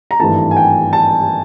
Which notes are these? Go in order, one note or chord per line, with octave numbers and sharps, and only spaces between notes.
A#5
G#1 G2 E3 A3 A5
G#5
G5
A5